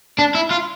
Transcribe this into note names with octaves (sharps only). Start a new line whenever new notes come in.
D4
E4
F4